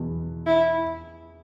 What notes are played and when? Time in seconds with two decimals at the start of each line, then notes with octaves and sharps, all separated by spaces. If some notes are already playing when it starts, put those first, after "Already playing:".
Already playing: E2 B2 B3
0.47 E4